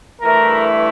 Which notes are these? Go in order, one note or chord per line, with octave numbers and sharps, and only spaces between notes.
G2 E3 A3 E4 A#4